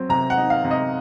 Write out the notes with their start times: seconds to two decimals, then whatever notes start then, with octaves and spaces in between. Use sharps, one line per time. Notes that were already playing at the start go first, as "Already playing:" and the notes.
Already playing: F#3 C4
0.09 C3 A#5
0.30 F#5
0.37 D#4
0.50 F5
0.65 C3
0.71 D#5